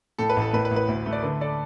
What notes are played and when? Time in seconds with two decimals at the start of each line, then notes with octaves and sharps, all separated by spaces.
0.19 A2 A4
0.29 B4
0.36 A1
0.42 A4
0.53 A2 B4
0.65 B4
0.71 A1
0.76 B4
0.88 D2
1.06 A3
1.13 D5
1.23 D3 B4
1.41 A4 D5